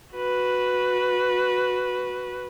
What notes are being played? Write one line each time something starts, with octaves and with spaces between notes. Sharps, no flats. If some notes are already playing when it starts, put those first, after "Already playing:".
F#4 B4